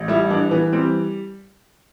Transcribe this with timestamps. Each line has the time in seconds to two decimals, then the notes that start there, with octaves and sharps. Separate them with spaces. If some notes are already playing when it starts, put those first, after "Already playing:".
Already playing: A1
0.08 G3 E4
0.30 E3 D4
0.51 E3 B3
0.73 G3 C4